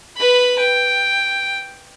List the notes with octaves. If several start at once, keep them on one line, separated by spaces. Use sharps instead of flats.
B4 B5
G5